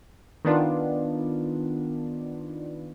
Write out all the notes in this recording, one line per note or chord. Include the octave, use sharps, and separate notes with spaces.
D#3 B3 D4 F4